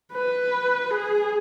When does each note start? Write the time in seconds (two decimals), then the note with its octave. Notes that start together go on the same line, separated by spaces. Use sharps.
0.13 B4
0.90 G#4